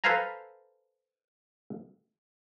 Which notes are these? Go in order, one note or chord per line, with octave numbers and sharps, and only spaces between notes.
A4 B4 C5 F5 G#5 A#5